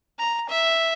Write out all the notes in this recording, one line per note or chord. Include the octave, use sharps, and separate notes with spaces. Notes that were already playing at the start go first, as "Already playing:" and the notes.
A#5
E5